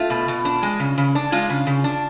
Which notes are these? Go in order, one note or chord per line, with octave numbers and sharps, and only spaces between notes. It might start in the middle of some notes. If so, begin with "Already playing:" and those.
Already playing: A3 F4
B2
B2
D4
G#3
C#3
C#3
D4
G#3 F4
C#3
C#3
D4